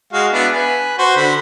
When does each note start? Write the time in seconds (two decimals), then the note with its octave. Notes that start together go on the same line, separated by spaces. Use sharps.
0.13 G#3 F#4 F5
0.32 B3 D4 E4
0.52 B4 G#5
0.99 F#4 C5
1.17 D3 B5